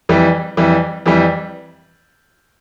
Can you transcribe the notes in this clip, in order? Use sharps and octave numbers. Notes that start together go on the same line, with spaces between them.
F2 E3 G3
F2 E3 G3
F2 E3 G3